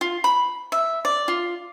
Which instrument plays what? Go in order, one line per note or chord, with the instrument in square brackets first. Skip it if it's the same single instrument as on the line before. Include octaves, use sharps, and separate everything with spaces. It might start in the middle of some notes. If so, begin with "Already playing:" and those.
[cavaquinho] F4
B5
E5
D5
F4